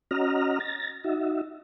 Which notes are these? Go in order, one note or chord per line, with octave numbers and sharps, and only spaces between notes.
C#4 F#4 D#5 A#5 F6
A6 A#6
D#4 F#4 E5